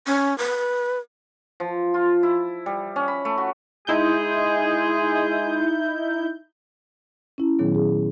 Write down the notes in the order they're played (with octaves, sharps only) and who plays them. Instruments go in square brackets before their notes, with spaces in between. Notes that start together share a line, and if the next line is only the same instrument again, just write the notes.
[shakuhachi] C#4
B4
[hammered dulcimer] F3
F4
E4
G3
C#4
B5
A3
F#4
[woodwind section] G#3 G#4 [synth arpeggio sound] D#4 E4 G6
[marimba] C#4 E4
A#2 D#3 F#3 B3 G#4 C#5
G#4